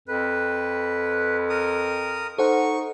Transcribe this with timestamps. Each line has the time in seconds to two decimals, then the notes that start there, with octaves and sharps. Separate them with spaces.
0.08 F2 B4
1.49 A#4 D#6
2.38 D#4 A4 C5 F#5 C#6